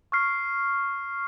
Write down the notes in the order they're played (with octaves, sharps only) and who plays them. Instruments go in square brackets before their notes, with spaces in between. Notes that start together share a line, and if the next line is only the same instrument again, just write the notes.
[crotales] C#6 F6 C7